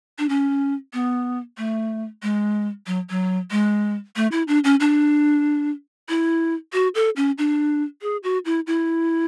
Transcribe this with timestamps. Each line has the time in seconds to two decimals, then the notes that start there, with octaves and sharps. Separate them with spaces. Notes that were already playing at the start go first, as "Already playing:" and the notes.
0.19 D4
0.29 C#4
0.93 B3
1.58 A3
2.23 G#3
2.87 F#3
3.10 F#3
3.51 G#3
4.16 A3
4.32 E4
4.48 D4
4.64 C#4
4.80 D4
6.09 E4
6.73 F#4
6.95 A4
7.16 C#4
7.38 D4
8.02 G#4
8.23 F#4
8.45 E4
8.67 E4